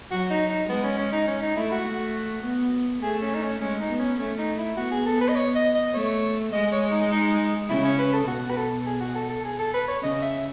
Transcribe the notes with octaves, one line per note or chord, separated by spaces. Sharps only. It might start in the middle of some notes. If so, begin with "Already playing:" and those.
F#3 F#4
D#4
D#4
G#3 B3
C#4
C#4
D#4
C#4
D#4
A3 E4
F#4
A3 F#4
B3
A3 G#4
C#4
D#4
C#4
G#3 C#4
D#4
B3
C#4
A3 C#4
D#4
E4
B3 F#4
G#4
A4
B4
D#5
C#5
D#5
D#5
A3 C#5
G#3 D#5
C#5
D#4
D#4
C#3 E4
C#4
B4
A4
B2 F#4
B4
A4
G#4
F#4
A4
A4
G#4
A4
B4
C#5
C#3 D#5
E5